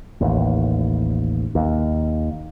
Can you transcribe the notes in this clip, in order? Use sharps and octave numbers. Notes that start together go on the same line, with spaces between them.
A1 D#2
D#2